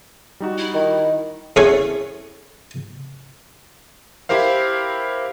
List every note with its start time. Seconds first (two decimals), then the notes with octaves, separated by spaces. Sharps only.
0.40 G3 D#4 F#4
0.58 E4
0.74 D#3
1.56 E2 C#4 F#4 A4 C#5
4.29 E4 G4 A#4 C5 F5